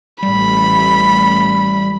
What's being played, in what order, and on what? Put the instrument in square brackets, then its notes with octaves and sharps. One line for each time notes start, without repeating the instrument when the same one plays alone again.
[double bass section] A1 [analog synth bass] G3 [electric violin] B5